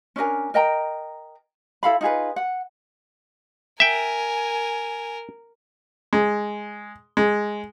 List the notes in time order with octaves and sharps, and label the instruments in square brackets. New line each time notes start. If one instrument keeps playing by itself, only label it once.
[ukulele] C#4 D4 A#4 G#5
A#4 D#5 G5 A#5
E4 A4 F5 B5
D#4 F4 G#4 B4
F#5
[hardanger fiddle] A#4 [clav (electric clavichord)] E5 G5 [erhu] G#5
[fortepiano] G#3
G#3